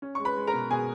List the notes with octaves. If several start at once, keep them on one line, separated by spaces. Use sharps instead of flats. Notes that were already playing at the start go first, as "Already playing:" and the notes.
C#4
G#3 C#6
B4 B5
G#3
A#4 A#5
B2
B2 G#4 G#5